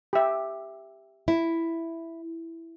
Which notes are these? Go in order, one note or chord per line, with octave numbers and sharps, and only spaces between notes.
G4 E5
E4